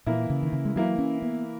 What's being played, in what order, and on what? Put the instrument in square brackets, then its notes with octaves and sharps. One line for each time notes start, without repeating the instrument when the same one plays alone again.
[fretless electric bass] A#2 [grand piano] E3 A#3 E4
[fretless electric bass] C#3
D#3
C#3
G#3
[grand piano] E3 A#3 E4 [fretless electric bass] F#3
[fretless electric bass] C#4
B3